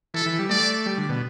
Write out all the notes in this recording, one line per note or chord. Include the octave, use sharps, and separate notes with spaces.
E3 A4
E3
G3
A3 D5
G3
D3
B2